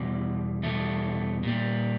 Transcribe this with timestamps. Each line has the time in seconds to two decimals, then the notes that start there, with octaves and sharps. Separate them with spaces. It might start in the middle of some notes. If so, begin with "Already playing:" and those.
Already playing: E2 B2 G3
0.63 E2 B2 G3 A3
1.43 A#2 G3